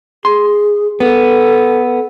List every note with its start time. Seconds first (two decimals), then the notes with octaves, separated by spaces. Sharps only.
0.25 G#4 C6
1.00 B3 A4